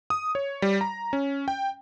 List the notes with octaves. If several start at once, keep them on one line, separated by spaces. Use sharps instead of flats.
D#6
C#5
G3
A#5
C#4
G5